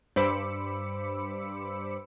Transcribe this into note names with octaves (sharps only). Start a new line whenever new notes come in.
G2 C5 B5 D6 E6 C#7